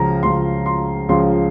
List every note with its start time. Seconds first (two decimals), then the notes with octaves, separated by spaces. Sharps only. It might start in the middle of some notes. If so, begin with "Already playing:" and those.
Already playing: C#2 C#3 F3 A#5
0.23 C#2 C#3 F3 C6
0.66 C6
1.09 C#2 C#3 F3 C6